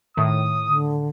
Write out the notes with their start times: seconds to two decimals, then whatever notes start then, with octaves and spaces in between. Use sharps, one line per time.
0.17 A2 D#3 D#6
0.67 D3